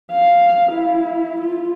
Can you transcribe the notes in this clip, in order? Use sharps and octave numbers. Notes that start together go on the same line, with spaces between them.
F5
E4
F4